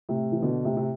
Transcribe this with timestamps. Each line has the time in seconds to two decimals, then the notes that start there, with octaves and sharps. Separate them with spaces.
0.09 A2 C3
0.32 E3
0.42 B2 D3
0.65 A2 C3
0.77 C3